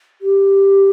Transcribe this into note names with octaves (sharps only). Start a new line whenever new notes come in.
G4